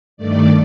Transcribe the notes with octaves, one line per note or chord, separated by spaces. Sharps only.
G2 D#3 A3 D5